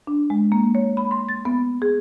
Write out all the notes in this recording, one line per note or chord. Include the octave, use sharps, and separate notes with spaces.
D4
G#3
A#3
C#5
B5
C6
A6
B3
G#4